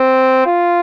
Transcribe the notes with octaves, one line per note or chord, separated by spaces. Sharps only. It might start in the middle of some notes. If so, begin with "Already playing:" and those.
Already playing: C4
F4